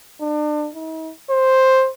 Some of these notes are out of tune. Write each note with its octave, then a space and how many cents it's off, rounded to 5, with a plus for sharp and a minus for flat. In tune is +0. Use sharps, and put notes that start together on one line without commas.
D4 +35
D#4 +45
C5 +5